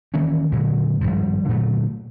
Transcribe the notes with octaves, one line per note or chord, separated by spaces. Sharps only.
D#3 E3 A#3 C#4
A#2 D3 F#3 G#3
G#1 E2 G2 F3
A#2 D3 F#3 A3